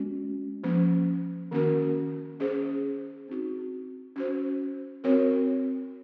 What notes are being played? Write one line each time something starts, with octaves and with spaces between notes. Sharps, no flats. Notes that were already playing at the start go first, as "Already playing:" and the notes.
Already playing: G#3 C#4 F#4
F3 A#3 C#4
D#3 A#3 C#4 F#4 A#4
C#4 G#4 C5
C4 D#4 F#4
C#4 F#4 C5
C4 F#4 A#4 C#5